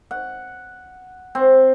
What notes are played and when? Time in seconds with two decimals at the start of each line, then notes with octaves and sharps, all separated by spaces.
0.11 F#5
1.35 C4